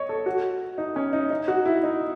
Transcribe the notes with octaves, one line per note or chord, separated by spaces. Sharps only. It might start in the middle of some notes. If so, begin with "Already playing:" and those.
Already playing: C#5 D#5
A4
F#4
D#4
C#4
D#4
D#4
F#4
E4
D#4